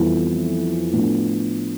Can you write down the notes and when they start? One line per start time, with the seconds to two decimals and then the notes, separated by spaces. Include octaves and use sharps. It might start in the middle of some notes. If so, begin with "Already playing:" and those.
Already playing: F2 E3 G3 B3 E4
0.93 A2 F3 B3 D4